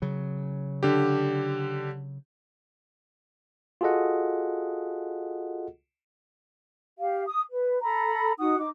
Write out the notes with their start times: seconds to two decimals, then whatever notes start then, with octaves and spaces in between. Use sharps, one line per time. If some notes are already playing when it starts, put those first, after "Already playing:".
0.02 C#3 F#3
0.83 D3 G4
3.81 F4 F#4 G#4 A4 D#5 F#5
7.00 G4 F5
7.25 D#6
7.50 B4
7.82 A4 A#5 B5
8.38 D#4 F#4 F#5 D#6
8.58 D#4 D6